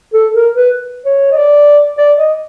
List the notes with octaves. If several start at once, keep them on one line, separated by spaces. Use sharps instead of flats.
A4
A#4
B4
C#5
D#5
D5
D5
D#5